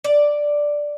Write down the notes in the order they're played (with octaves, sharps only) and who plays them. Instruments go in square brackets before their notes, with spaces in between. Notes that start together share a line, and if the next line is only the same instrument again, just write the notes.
[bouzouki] D5